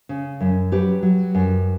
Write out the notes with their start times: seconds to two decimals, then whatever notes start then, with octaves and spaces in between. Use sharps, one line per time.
0.09 C#3
0.40 F#2
0.72 F#3 G4 B4
1.03 F#3
1.34 F#2